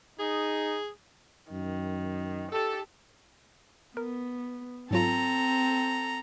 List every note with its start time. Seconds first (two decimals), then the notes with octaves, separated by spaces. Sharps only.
0.20 D#4 G#4
1.51 F#2 D#3
2.51 G4 A4
3.97 B3 A#4
4.91 G#2 F#3 C4 F4 A4 A#5